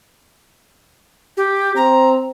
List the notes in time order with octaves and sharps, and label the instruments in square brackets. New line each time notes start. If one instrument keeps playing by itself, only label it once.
[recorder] G4
[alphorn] C4 [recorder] A#5